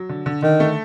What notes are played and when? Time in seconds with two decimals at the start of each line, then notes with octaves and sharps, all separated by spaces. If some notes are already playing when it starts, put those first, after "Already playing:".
Already playing: F#3
0.09 D3
0.26 D3
0.42 D3 D#3
0.60 A3